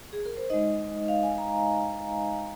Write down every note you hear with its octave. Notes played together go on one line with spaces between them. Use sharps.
G#4
A#4
C5
G#3 D#4 D#5
F5
G#5
A#5